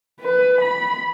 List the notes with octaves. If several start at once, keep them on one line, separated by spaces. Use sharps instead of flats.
B4
B5